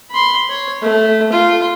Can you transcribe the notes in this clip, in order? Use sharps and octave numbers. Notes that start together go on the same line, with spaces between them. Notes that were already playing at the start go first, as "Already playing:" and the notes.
B5 C6
C#5
A3
F4